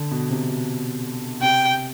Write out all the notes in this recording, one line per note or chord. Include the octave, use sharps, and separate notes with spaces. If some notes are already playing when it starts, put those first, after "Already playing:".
Already playing: D3
B2
C3
B2
C3 G5